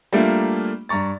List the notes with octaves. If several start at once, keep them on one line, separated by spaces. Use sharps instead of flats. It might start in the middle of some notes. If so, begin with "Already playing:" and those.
G3 A3 A#3 D4 F4
G2 A#5 C#6 A6